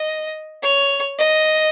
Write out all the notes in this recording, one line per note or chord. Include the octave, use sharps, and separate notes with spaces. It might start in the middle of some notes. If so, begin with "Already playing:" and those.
Already playing: D#5
C#5
D#5